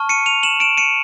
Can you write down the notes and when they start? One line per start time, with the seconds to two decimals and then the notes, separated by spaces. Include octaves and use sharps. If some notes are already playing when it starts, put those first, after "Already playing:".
Already playing: A5 C#6 F6
0.09 C#7 D#7
0.26 D#7 F7
0.43 E7 F#7
0.60 D7 E7
0.77 C#7 D#7